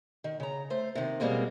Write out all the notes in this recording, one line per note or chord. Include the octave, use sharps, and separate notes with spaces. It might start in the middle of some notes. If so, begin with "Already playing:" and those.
D#3
C#3 A#5
A3 C5
C3 D#3
B2 G3 G#3 A#3 C4